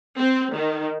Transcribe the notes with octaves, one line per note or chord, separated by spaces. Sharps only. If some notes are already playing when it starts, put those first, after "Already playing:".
C4
D#3